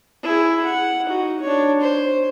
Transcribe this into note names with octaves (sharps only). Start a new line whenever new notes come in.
E4 G#4
F#5
D#4 F#4
D4 C#5
C5